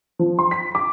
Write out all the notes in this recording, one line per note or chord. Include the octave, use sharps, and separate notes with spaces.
F3
C6
B6
D6